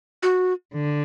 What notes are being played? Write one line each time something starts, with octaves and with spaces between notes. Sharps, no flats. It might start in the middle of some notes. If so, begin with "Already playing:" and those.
F#4
D3